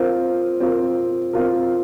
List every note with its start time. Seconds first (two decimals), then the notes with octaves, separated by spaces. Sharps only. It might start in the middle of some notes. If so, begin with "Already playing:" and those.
Already playing: C4 F4 A#4
0.60 C4 F4 A#4
1.33 C4 F4 A#4